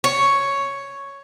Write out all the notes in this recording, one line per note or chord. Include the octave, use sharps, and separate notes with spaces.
C#5